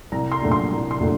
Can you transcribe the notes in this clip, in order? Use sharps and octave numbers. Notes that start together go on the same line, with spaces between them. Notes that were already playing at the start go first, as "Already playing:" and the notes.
C2 A#5
C6
A#2 F#3 A3 D4
C6
C2
C6
A#2 F#3 A3 D4